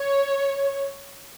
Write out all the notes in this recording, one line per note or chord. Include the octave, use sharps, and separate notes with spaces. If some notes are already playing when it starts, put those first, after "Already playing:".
Already playing: C#5